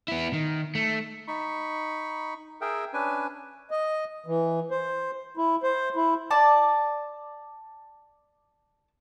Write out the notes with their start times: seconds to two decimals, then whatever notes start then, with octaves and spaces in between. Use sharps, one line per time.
0.08 B3 E4
0.33 D#3
0.75 A3
1.28 D#4 B5 C#6
2.61 G#4 A#4 E5 G5
2.93 C#4 D4 B4 G#5
3.71 D#5
4.26 E3
4.71 C5
5.37 E4
5.63 C5
5.96 E4
6.31 D5 A5